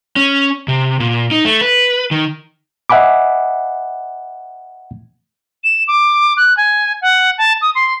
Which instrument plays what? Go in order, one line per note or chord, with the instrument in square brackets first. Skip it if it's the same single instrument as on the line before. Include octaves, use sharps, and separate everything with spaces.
[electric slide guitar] C#4
C3
A#2
D#4
A3
B4
D#3
[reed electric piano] D#5 E5 F#5 G#5 B5 D6
[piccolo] E7
D6
F#6
G#5
F#5
A5
D#6
C6